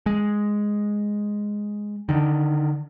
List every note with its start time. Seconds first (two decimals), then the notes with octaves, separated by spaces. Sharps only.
0.06 G#3
2.09 D3 D#3